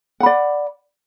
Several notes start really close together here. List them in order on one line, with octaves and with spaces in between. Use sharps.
F#5 B5 D5